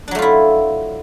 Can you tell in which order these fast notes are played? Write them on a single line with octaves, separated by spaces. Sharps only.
D4 F#3 A3 F4 E4